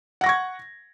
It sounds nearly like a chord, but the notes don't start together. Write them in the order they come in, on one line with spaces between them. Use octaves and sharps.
F#5 A#6 C#6 G#6